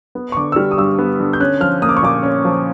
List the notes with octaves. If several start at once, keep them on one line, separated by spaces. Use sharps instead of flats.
B3
C#6
D3 D6
E6
G3 F6
D#6
G2 E6
B3
D3
G6
C#4 F#6
F3 F6
A#3 D#6
D6
C#6
A#2 D6
C#4
F3